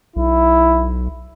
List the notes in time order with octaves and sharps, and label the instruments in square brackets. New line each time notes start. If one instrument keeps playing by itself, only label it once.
[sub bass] B1 [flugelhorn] E4